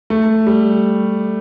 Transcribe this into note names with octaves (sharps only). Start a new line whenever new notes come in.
A3
G3